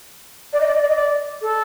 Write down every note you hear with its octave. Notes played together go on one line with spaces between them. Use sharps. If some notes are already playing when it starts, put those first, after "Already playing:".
D5
D#5
D5
D#5
D5
D#5
D5
A4